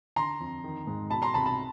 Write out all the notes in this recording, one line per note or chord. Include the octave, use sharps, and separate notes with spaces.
D3 A#5 C6
F2
D#3
G#2
B2 A5 B5
A#5 C6
C2 A5 B5
A5 B5